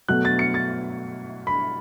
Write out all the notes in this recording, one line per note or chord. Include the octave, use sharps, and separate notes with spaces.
B2 F#3 A3 F#6
A6
C#7
A6
B5